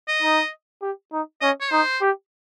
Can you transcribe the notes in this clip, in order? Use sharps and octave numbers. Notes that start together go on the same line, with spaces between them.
D#5
D#4
G4
D#4
C#4 D#5
C#5
D#4 C5
G4